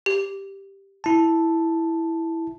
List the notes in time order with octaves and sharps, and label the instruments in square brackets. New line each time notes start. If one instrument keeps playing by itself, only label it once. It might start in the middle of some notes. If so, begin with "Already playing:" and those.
[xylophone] G4
[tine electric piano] E4 A5